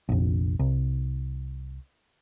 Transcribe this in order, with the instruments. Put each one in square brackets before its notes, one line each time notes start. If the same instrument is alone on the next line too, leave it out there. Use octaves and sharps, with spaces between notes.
[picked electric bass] F1 A#1
C2